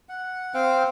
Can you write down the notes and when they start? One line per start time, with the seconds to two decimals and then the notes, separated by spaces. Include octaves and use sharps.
0.09 F#5
0.54 C4 C5 F5 G5